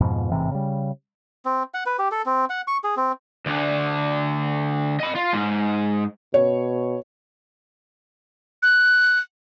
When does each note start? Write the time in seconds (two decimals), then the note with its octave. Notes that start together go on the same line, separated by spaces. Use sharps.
0.01 F2 G#2 B2 F3
0.32 A1 G#2 C3 E3
0.51 C#3 G3
1.45 C4
1.74 F#5
1.86 B4
1.99 G4
2.12 A4
2.26 C4
2.50 F#5
2.67 C#6
2.84 G#4
2.97 C4
3.46 D2 D3
5.00 D#5 B5
5.15 F4
5.33 G#2
6.34 B2 C#5
8.63 F#6